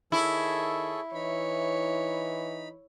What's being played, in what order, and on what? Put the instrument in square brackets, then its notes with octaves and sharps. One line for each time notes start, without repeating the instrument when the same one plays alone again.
[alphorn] D#3 [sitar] E4 [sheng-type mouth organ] G#4 A4 C#5
[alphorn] E3 [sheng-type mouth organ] D#4 B5 [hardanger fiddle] C#5